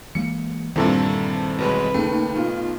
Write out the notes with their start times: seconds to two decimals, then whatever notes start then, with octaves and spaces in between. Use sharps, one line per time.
0.15 E3 G#3 A#3 C#7
0.76 E2 G2 A#2 D#3 G3 C4 E4 A4
1.58 A1 B2 G#3 B4
1.94 D#2 C#3 A3
2.36 B1 F4